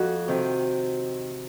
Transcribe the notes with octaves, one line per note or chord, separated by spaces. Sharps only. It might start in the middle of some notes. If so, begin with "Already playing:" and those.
Already playing: F2 F#4
C3 D#3